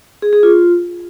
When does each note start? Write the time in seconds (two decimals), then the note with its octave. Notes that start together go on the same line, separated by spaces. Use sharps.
0.22 G#4
0.33 G#4
0.43 F4